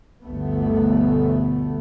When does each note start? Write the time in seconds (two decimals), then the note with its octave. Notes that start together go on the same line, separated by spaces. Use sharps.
0.24 G1 D2 B2 A3 B3